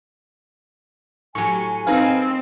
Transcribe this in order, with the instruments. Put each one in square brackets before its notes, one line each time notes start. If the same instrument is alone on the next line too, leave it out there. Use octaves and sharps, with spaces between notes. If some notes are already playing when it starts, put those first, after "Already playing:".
[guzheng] A2 F#3 [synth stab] G4 C#6 [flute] G#5
[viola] C4 [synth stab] D#4 B4 F5 [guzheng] G#4 D#5